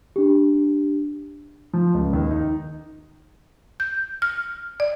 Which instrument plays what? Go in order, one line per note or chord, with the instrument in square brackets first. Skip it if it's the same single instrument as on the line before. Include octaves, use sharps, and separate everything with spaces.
[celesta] D4 G4
[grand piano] F3
C#2
D#2
D#4
[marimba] G6
F6
D5